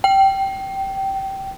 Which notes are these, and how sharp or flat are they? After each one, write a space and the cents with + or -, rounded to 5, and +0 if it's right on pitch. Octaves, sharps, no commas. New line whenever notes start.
G5 -15